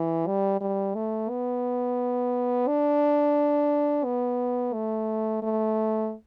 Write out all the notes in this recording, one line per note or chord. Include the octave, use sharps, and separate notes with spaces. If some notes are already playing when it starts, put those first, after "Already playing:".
Already playing: E3
G3
G3
A3
B3
D4
B3
A3
A3